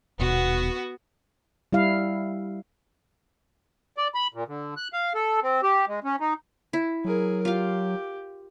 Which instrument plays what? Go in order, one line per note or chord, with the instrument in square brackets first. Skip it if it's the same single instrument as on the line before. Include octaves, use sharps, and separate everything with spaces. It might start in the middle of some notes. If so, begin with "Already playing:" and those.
[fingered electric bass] D#1 B2 [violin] B3 F#4
[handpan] G3 E4 F5
[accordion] D5
B5
A#2
D3
F#6
F5
A4
C4
G4
G#3
C#4
D#4
[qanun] E4
[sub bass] F#3 [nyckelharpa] G#4 A#4
[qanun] F4 F5 [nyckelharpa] G4